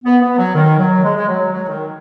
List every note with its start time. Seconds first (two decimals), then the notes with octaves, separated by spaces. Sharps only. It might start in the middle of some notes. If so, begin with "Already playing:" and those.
0.05 B3
0.21 B3
0.37 F#3
0.55 D#3
0.79 F#3
1.04 G#3
1.16 G#3
1.27 F#3
1.52 F#3
1.68 D#3